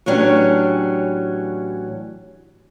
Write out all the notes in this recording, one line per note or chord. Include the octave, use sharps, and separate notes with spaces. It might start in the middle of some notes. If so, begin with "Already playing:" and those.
A2 E3 F#3 C#4 D4 G4